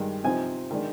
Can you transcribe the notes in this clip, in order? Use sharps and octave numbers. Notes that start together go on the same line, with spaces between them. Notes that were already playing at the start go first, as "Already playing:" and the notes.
Already playing: G2 D#3 G#3 D#4
C3 F3 C4 D#4 G#5
D#3 G#3 D4